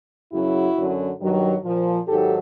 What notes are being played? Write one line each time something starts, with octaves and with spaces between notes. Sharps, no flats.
F#2 C#3 F#3 E4 F#4
F#2 D3 F#3
G2 D#3 F#3
A#2 F3
G#2 D#3 F#3 G4 A4